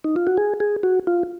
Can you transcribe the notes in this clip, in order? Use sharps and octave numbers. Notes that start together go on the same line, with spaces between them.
D#4
F4
F#4
G#4
G#4
F#4
F4